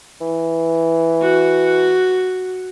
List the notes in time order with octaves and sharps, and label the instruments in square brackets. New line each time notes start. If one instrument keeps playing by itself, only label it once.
[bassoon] E3
[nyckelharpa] F#4